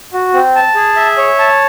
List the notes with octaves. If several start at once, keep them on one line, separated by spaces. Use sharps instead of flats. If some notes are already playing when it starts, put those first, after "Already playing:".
F#4
C4
A5
G#4
E5
C#5
A5